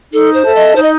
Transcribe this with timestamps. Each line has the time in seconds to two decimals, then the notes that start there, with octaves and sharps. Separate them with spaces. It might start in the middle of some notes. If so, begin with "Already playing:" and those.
0.13 D#4 A4
0.34 C5
0.44 A4 E5 A5
0.55 D#5
0.75 D#4 C5
0.82 D#5